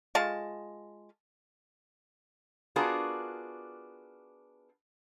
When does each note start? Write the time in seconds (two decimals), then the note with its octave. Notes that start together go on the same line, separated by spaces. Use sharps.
0.15 G#3 F4 A5
2.76 B3 D4 F4 F#4 G#4 A#4